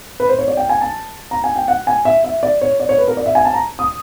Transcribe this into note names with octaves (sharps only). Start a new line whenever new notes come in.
B4
C5
C#5
D5
G5
G#5
A5
A#5
G#5
G5
F#5
G#5
E5
E5
D5
C#5
D5
C#5
B4
A#4
D5
E5
G#5
A5
A#5
D#6